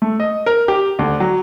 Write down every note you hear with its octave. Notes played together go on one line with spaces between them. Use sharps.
A3
D#5
A#4
G4
D2
F#3